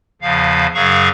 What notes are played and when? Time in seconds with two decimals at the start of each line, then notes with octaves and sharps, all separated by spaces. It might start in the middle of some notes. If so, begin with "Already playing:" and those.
0.22 E2 C#3 F3 F5
0.74 F#2 C#3 F#3 G#4 F5 C#6